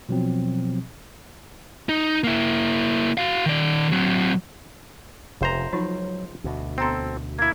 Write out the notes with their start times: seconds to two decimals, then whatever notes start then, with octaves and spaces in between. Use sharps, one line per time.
0.09 B2 F3 F#3 C4
1.89 D#4
2.24 A#3 E4
3.18 F#4 F5
3.46 D#3 D5
3.92 F#3 C4
5.41 F1 C#2 C3 C5 A#5
5.73 F3 F#3 D#4 F4
6.44 D2 B2
6.78 B3 C4 A4 A#5 C6
7.39 A#3 E4 G#6